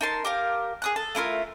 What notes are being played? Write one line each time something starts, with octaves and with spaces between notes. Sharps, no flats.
D#4 A#4 A5 C6
G4 A#4 F5
G#4 D#6 F#6
A4
A3 E4 F4 A#4